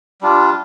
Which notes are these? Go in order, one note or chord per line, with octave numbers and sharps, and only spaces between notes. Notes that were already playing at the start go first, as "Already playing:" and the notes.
G3 D4 F4